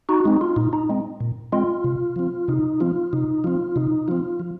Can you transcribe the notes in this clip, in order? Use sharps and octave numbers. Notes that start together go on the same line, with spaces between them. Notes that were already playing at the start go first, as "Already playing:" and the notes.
D#4 F#4
G#3 C4 D#4
F4
A#2 D#4
D#4
G#3 C4
A#2
G#3 C4 F4
C3
F3 C4
C3 D#4
F3 C4 F4
C3 D#4
F3 C4 F4
C3 D#4
F3 C4 F4
F3